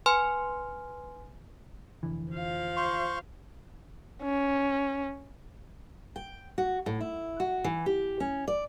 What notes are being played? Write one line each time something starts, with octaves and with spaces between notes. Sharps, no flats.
B4 G#5 C6 F6
F1 D3 E3
F3 F5
C5 C6 C#6
C#4
G5
F#4
A2
E4
F#4
E3
G4
C#4
D5